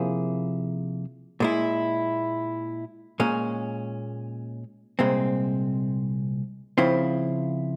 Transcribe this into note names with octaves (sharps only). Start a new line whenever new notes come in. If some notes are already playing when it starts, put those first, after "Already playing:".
Already playing: C3 F3 A#3 E4 G#4
A#2 G#3 E4
A#2 G#3 C#4
C2 A#2 G#3 C4
C#3 F3 C4 E4